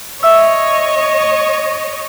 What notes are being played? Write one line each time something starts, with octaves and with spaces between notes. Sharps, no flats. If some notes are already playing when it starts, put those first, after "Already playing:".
C#5 D#5 E5 E6